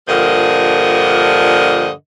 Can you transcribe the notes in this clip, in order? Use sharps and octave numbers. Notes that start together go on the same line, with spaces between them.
G2 A#2 D3 F3 A#4 D#5